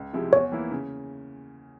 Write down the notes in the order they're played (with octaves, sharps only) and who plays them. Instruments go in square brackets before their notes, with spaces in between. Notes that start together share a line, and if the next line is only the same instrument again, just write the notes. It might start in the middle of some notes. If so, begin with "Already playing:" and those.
Already playing: [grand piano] C#2
C3 F3 G#3 E4
[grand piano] E2 [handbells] C#5
[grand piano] E3 A#3 E4
C#3